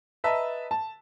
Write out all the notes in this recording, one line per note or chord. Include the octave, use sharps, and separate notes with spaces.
B4 D#5 E5 A5 A#5
A5